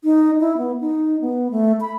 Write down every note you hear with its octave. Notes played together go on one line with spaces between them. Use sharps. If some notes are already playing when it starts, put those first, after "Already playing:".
D#4
E4
B3
D#4
B3
A3
B5